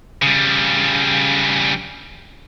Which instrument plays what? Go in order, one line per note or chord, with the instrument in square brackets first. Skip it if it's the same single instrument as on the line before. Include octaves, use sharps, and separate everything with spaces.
[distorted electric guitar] C#3 G3